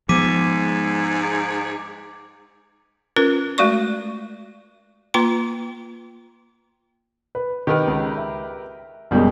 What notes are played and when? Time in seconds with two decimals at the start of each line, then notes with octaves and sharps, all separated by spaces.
0.09 G#2 F3 G#3 B3 D6 B6 D#7
3.16 C#4 F4 A#4 B4
3.58 G#3 A3 F#4 D5 C#6
5.14 A#3 F4 B4 A#5 C6
7.35 B4
7.67 D#3 G4 A#4 B4
7.87 C#2
8.17 E5
9.11 F#1 B2 G3 G#3